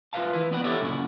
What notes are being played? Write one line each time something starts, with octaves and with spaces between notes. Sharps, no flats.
F4 B4 C5 E5 F5 A5
E3 E4 B4
B3 B4 D5 E5 F#5
E4 G4 A4 C#5 D5 E5
F#2 A#2 C#3 D4 E4 F#4